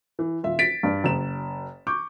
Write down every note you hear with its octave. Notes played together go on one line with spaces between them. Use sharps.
E3
D#1 F4 E5
A6 B6 D7
G2 D5
F#1 E7
C#6 D6 G6